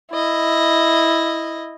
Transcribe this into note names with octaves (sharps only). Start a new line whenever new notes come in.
E4 D#5